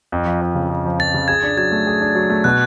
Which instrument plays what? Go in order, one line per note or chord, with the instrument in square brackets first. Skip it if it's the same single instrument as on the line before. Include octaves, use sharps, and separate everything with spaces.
[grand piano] F2
F3
F2
C#3
F2
F3
[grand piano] F2 [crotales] A6
[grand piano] C#3
[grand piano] G#4 [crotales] G#6
[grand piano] D4
[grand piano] F#3 [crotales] G#6
[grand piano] A3
G#4
D4
F#3
A3
[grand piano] B2 [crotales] F#6